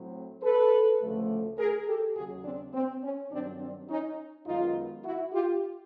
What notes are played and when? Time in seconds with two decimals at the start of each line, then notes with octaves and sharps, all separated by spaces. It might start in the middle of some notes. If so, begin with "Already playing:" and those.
Already playing: A2 F#3 C4
0.43 A4 B4
1.00 D2 C#3 F3 A3
1.58 G#4 A#4
1.87 G4 A4
2.16 D#2 C#3 F#3 F#4 G#4
2.44 C4 D4
2.73 C4
3.03 C#4
3.31 G2 D#3 F#3 C4 D4
3.60 C4 D4
3.89 C#4 D#4
4.46 F#2 D#3 G#3 B3 D#4 F4
5.05 E4 F#4
5.33 F4 G4